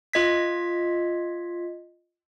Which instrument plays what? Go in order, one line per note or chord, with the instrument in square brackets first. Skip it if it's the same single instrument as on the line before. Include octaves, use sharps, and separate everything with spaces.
[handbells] F4 D#5 G#6 B6